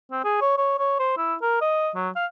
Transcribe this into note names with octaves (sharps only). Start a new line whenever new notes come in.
C4
G#4
C#5
C#5
C#5
C5
E4
A#4
D#5
F#3
F5